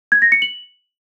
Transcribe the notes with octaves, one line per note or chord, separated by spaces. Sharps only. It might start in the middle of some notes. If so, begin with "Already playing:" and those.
G#6
A#6
C#7
F#7